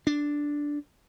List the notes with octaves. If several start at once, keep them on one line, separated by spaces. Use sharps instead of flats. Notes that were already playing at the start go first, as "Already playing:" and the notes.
D4